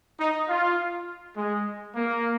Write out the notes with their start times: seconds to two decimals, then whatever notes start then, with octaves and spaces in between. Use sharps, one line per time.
0.20 D#4
0.48 F4
1.37 G#3
1.95 A#3